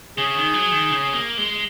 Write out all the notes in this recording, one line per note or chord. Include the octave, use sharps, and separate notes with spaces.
C#3 G#4
D#3
F#3
D#3
C#3
A#3
G#3